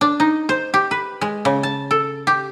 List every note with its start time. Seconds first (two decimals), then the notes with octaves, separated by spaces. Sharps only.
0.01 D4
0.20 D#4
0.49 C5
0.74 G4
0.91 B4
1.21 G#3
1.45 C#3
1.63 A5
1.91 A4
2.27 G4